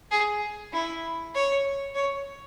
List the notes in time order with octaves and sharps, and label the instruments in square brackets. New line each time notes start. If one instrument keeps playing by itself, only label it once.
[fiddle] G#4
E4
C#5
C#5